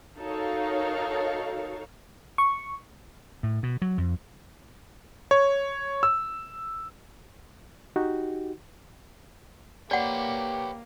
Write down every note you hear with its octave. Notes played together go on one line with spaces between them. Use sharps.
D#4 F#4 A4 A#4 C#5 F5
C#6
A2
B2
F#3
F2
C#5
E6
D#4 F#4 G4
A#3 G4 B4 C#5 D5 F#5